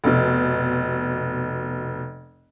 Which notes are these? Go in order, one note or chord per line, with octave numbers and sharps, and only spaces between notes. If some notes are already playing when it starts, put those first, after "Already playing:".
F1 B2